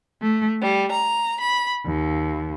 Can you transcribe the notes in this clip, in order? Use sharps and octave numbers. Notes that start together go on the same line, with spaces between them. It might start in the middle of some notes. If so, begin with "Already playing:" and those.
A3
G3
A#5
B5
D#2